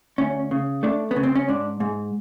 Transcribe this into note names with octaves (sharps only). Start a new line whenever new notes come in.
D2 C#4
C#3
A3 D4
B3
C#3
C4
C#4
G#2 D4
G#2